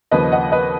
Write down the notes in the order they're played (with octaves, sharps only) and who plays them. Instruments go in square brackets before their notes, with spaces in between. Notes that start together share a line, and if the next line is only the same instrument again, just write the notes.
[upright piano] D#2 C#3 F3 B4 D#5
D#5 F#5
B4 D#5